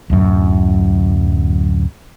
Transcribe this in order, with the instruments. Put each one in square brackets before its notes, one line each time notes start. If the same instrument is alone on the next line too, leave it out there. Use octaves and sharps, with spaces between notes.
[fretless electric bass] D1 F#2